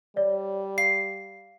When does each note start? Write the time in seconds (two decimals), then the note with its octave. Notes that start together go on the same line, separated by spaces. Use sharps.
0.16 G3 C#5 D5
0.78 F5 C7